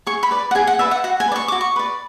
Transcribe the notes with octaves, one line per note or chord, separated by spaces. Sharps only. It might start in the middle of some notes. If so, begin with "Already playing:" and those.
G#4 C#6
B5
B4 D5
F#5
G#4 G#5
F#5
B4 D5 E5
F#5
F#4 F#5
G#5
B4 D5
C#6
F#4 D6
C#6
B4 D5